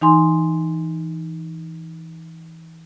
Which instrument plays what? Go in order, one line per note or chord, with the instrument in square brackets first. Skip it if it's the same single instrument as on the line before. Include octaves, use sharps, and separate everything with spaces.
[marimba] E3 D#4 G#5 C6